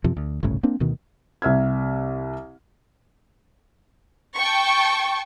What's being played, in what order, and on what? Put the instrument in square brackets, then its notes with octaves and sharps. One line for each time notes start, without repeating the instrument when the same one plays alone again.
[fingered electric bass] F#2 C3 F3
D2
G1 C2 A2 C#3
A#3 C4 D4
D2 B2 D#3
[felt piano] C2 E5 F6 G#6
[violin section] G5 A5 C#6